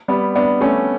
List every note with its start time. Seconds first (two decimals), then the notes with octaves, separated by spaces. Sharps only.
0.08 G3 B3
0.36 B3 D4
0.61 A3 C#4